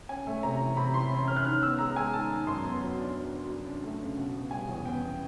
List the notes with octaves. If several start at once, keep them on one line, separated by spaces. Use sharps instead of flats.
C#4 G#5
A3
C3 A#5
E3
C3 B5
E3 C6
C#4
C#4 F6
F#6
D#3 F6
B3 E6
G#3 A#5
G#3 G#5
D#3 A5
D#3
F#2 C6
B3
F#3
D4
F#3
F#3
D4
D4
A3
C#3
B2
B3
G3 G#5
E2
B3 G5
B3